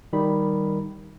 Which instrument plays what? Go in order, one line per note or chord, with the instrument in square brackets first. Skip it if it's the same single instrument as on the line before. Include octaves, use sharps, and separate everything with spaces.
[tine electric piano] D#3 G3 B5